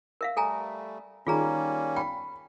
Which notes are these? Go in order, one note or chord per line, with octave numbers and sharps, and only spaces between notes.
A#4 E5 F5
G3 A3 A4 G#5 A#5
D#3 G3 A#3 C#4 F4 G#4 A#5
G5 B5